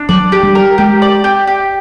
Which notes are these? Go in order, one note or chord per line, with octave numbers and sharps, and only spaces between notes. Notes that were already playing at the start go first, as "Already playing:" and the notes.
Already playing: D4
F#3 D5
G4
G3
A#4
G#3 G4
D5
G4
G4